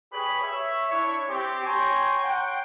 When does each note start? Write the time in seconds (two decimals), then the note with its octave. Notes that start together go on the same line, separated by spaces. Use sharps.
0.12 G4 G#4 B4 C#5 B5
0.42 C#5 E5
0.91 D4 E4 C#5
1.29 C4 G4
1.65 C#5 G5 G#5 A#5 C6
2.23 F#5 G5